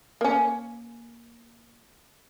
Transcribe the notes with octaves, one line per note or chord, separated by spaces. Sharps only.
A#3 C#4